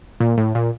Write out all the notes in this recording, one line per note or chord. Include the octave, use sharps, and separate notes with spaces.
A#2
A2
A#2